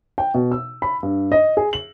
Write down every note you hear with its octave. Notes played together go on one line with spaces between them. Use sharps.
G5
B2
E6
B5
G2
D#5
G#4
F#7